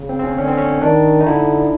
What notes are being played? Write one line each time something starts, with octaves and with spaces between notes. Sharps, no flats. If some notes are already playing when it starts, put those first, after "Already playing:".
Already playing: C#3
C4
C4
C#4
D3 C#4
C4
C#4
D#3 D4
D#4
D3 E4